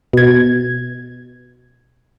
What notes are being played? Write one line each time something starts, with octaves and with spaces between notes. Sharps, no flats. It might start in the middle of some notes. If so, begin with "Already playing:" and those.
B2 G#6